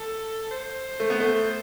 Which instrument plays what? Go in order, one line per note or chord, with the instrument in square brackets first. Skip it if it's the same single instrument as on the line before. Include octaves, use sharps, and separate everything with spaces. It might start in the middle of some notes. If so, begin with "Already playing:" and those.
Already playing: [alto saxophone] A4
C5
[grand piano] A3
B3
A3